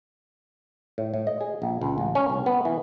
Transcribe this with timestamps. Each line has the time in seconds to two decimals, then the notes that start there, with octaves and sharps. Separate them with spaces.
0.98 A2
1.14 A2
1.27 D#5
1.41 G#4
1.62 A#1
1.81 C#2
1.98 A1
2.15 C#4
2.30 C2
2.46 B3
2.65 E3